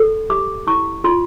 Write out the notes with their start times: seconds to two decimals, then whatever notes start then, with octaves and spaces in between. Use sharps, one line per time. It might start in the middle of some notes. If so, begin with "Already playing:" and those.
Already playing: A4
0.30 G4 D6
0.67 E4 C#6
1.04 F4 C6